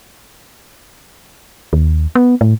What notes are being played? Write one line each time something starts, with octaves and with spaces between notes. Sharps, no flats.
D#2
B3
A2